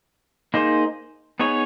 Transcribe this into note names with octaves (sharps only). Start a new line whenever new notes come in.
A#3 D#4 G#4 C5
B3 D#4 G#4 C#5